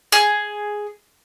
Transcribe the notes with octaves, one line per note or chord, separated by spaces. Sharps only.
G#4